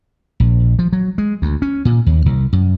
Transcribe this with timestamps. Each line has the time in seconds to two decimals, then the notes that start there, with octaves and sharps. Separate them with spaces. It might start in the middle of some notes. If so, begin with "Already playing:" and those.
0.40 A#1
0.79 F3
0.93 F#3
1.18 G#3
1.42 D2
1.62 C#4
1.85 A#2
2.06 D#2
2.26 C2
2.53 F#2